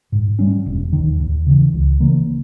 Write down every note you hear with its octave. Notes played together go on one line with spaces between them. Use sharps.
G#2
G3 C#4
E1
D#2 D#3
D#2
C#3 E3
C#2
C#3 E3 A#3